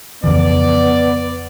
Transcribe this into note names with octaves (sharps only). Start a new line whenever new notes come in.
F2 C#3 E3 B3 D5